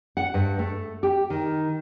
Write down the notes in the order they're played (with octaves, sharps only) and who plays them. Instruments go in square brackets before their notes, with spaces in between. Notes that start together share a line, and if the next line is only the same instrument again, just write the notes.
[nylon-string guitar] F#5
G2
A3
G4
D#3